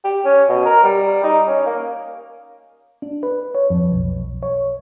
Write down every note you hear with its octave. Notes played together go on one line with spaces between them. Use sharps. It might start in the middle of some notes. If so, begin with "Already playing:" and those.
G4
C#4
B2
A#4
G3
D#4
C#4
A#3
D4
B4
C#5
F2
B1
C#5